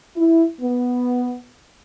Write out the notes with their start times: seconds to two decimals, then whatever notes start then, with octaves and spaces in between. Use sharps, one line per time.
0.16 E4
0.61 B3